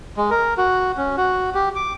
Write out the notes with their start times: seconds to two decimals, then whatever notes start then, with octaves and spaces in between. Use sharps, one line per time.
0.17 G#3
0.30 A#4
0.58 F#4
0.97 C#4
1.17 F#4
1.55 G4
1.76 D6